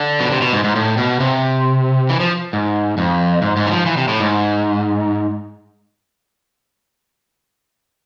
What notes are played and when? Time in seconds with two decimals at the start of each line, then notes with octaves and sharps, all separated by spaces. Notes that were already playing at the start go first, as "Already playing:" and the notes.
Already playing: D3
0.20 B2
0.31 C3
0.41 B2
0.53 G#2
0.64 G#2
0.76 A2
0.98 B2
1.20 C3
2.09 E3
2.20 F3
2.53 G#2
2.98 F2
3.42 G#2
3.57 G#2
3.67 E3
3.72 F3
3.86 E3
3.97 C3
4.08 A2
4.20 G#2